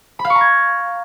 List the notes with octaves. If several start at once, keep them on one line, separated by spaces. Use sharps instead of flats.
B5
F5
C#6
A#5
G#6